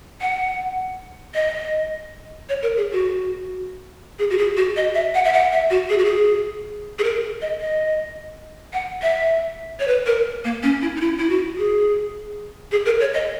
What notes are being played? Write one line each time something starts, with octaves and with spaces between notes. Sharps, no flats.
F#5
D#5
C#5
A#4
G#4
F#4
G#4
F#4
G#4
F#4
D#5
E5
F#5
E5
F#5
E5
F#4
G#4
F#4
G#4
G#4
A#4
D#5
D#5
F#5
E5
C#5
B4
A#4
A#3
C#4
E4
D#4
E4
E4
F#4
G#4
G#4
A#4
C#5
D#5